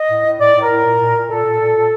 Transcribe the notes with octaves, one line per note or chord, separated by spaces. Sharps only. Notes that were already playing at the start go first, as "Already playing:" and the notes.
Already playing: D#5
A2
A2
A2 D5
A2
A#4
A2
A#2
A#2
A#2
A#2 A4
A#2
A#2
A#2